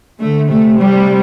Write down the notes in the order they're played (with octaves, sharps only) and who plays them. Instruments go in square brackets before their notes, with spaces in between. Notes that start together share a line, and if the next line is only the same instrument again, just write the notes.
[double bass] D3 [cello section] A3
[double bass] C3 [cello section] A3
[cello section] G3